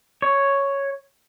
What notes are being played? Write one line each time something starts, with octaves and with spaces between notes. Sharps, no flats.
C#5